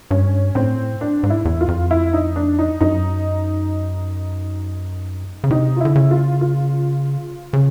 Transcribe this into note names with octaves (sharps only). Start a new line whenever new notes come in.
G2 C#4
A2 C4
D4
G#2
E4
E2
F4
F2
E4
D#4
D4
D#4
F#2 D#4
C#3
C3 D#4
F4
D3 E4
C#3
F4
F4
C#3